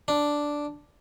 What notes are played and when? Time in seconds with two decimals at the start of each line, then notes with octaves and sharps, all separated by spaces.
0.08 D4